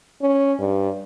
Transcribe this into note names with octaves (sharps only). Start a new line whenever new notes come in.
C#4
G2